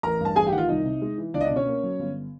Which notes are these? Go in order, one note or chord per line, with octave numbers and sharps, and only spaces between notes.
A1 A#4 A#5
G2
A5
A1 G#4 G#5
G4 G5
D#3 F#5
F4 F5
C2 D#4 D#5
C3
G#3
E3
C#2 D4 D5
D#5
D4 D5
B2
C#4 C#5
A#3
F#3
G1